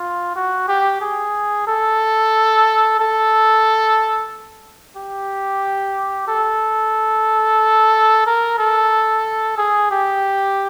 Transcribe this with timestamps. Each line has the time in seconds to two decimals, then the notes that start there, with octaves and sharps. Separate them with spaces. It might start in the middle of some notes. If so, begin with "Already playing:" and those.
Already playing: F4
0.35 F#4
0.68 G4
1.01 G#4
1.67 A4
2.99 A4
4.96 G4
6.28 A4
8.26 A#4
8.59 A4
9.58 G#4
9.91 G4